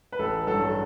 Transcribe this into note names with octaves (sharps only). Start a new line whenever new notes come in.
B4
A1 A4
G2 F#3 A4
A4